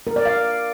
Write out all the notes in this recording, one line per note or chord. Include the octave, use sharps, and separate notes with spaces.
A#4
D5
F5